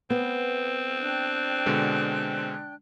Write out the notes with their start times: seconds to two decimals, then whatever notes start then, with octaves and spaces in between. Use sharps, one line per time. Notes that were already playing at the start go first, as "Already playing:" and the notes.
0.10 B3 C4
0.98 D4 G5 F#6
1.66 B2 D3 G#3